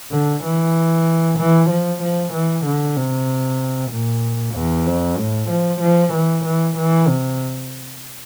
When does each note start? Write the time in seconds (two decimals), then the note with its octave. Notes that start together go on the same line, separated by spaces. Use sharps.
0.12 D3
0.44 E3
1.39 E3
1.70 F3
2.02 F3
2.33 E3
2.66 D3
2.97 C3
3.92 A#2
4.55 E2
4.87 F2
5.19 A2
5.50 F3
5.81 F3
6.14 E3
6.45 E3
6.77 E3
7.08 C3